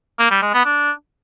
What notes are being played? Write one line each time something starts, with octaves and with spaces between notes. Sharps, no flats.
A#3
G3
G#3
B3
D4